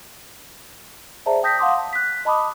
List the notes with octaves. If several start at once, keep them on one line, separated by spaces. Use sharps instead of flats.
G#4 C5 D5 E5 A5 A#5
G5 A5 D#6 G6 A#6 B6
F5 F#5 A5 C6 D6 D#6
A5
F#6 B6
D#5 A5 B5 D6 D#6